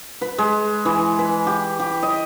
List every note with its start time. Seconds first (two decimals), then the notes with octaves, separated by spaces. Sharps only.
0.21 B4
0.38 G#3
0.85 E3
1.19 B4
1.47 G4
1.80 G4
2.03 D#5